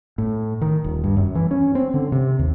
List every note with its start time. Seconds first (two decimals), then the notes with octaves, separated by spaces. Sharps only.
0.18 A2
0.61 D#3
0.84 D#1
1.04 G2
1.17 F#2
1.35 E3
1.51 C#4
1.75 C4
1.94 D3
2.12 C3
2.39 D#2